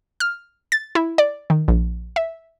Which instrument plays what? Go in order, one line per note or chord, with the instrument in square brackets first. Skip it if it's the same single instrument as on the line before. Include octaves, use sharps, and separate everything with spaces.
[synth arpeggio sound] F6
A6
E4
D5
D#3
A#1
E5